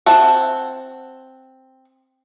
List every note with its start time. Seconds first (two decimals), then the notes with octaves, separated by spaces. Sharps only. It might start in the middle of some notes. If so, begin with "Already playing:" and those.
0.06 C4 E5 F#5 A5